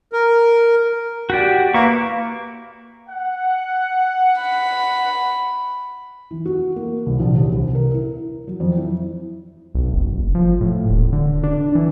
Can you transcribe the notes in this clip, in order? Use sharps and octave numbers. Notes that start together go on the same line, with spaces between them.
A#4
F#4 G4 D5
A#3 E4 B4 C#6
F#5
B5
E3
F#4
A#3
C2
A#1
D#2
C2
A#4
E4
F#3
F2
E4
B1
F#1
F#1
F3
A2
D#1
D3
D4
E3